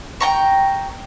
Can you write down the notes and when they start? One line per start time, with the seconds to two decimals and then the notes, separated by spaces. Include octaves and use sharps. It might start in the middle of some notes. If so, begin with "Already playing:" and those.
0.20 G5 A#5 C#6